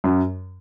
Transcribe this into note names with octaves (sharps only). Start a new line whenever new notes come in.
F#2